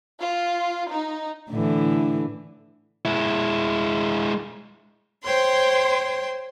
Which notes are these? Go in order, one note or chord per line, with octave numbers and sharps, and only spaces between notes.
F4
D#4
A2 D3 E3
G#3 E4
C5 C#5 G5 C6